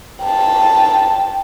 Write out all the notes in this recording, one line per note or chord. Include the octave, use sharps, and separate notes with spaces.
G5 A5